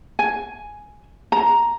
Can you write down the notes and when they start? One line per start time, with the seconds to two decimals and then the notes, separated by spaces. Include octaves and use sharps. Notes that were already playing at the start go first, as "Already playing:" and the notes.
0.19 G#5
1.32 A#5